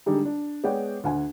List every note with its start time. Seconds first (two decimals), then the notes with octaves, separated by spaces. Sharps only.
0.06 D3 G3 G#3 D#4 G4
0.25 D4
0.64 G#3 B3 C#5 D5 F#5 G5
1.04 D2 F#5 G#5